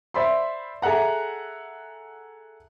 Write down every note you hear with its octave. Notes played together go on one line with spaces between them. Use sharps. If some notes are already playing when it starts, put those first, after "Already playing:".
C5 D5 E5 B5 C6
G#4 A4 E5 F#5 A#5